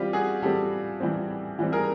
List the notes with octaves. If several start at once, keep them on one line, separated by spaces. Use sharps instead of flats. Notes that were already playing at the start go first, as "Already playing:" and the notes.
Already playing: E3 G3 C4 F4 G4
F#4 G#4
E3 G3 C4 G4 A4
E3 G3 C4
E3 G3 C4
G#4 A#4